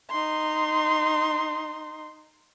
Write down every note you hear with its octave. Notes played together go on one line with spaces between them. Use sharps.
D#4 C6